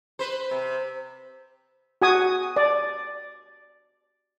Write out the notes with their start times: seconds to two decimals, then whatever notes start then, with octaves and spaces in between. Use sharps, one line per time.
0.19 B4 C5
0.51 C3
2.02 F#4 G#5 D#6
2.56 D5